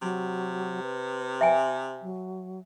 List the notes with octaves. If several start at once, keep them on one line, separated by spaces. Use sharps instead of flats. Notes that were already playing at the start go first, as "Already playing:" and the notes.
C3 F#3
B4
E5 G5 G#5
F#3